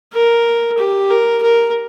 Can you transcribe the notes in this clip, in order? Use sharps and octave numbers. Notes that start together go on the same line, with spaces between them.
A#4
G4
A#4
A#4